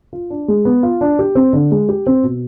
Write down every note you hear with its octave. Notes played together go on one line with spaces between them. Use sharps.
F4
D4
G#3
B3
F4
D4
G4
C4
D3
G#3
G4
C4
B2